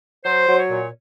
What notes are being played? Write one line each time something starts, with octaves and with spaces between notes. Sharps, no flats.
F#3 C5
F#3
C#5
A#2